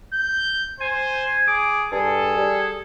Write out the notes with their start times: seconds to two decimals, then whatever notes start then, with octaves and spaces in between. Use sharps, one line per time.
0.13 G6
0.80 C5 G#5
1.48 G#4 D6
1.92 G2 G#4 A4
2.37 G3